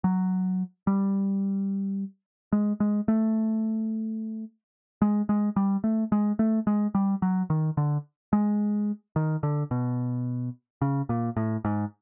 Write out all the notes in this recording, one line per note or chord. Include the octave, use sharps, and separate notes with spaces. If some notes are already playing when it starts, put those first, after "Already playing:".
F#3
G3
G#3
G#3
A3
G#3
G#3
G3
A3
G#3
A3
G#3
G3
F#3
D#3
D3
G#3
D#3
D3
B2
C#3
A#2
A2
G#2